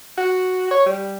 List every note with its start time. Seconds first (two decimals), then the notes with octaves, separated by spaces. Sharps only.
0.18 F#4
0.71 C#5
0.86 G3